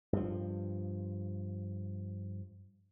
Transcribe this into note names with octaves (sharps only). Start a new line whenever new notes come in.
G2 F3